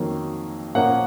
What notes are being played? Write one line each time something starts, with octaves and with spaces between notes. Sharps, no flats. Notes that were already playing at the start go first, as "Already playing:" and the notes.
Already playing: F2 D#3 F#3 A#3 C#4
A#2 F3 A#3 C#4 F#5